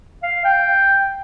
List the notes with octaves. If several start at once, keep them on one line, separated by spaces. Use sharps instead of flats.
F5
G5